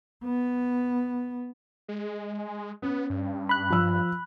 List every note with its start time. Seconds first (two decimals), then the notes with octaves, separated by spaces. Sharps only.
0.24 B3
1.88 G#3
2.82 B3 C#4
3.10 G2
3.49 B5 F#6
3.70 F3 E6